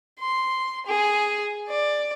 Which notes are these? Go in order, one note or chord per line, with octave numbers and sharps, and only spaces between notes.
C6
G#4
D5